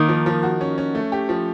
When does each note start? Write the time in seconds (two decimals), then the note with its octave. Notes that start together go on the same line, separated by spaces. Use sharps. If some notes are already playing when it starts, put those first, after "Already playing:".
Already playing: D#3 A#3
0.09 F3
0.26 F3
0.43 F#4
0.61 C#4
0.78 C#4
0.95 A3
1.12 G4
1.29 F3